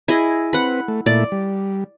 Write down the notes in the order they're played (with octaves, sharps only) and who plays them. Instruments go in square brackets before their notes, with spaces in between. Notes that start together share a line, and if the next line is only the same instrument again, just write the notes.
[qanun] E4 G#4 D#5
[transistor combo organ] C4 B4 [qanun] F#5 B5
[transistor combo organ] A3
[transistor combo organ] A#2 A3 E4 [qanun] D5
[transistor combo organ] G3